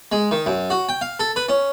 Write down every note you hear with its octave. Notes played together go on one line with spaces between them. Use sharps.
G#3
D#3
F#2
F#4
G5
F5
A4
B4
C#4